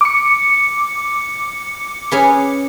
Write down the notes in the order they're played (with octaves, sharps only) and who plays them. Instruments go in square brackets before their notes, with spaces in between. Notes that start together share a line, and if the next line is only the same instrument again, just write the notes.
[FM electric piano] D6 C#7
[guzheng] C#4 G#4 B4